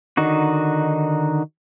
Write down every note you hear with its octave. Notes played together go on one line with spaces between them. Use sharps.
D3 D#3 D#4 F#4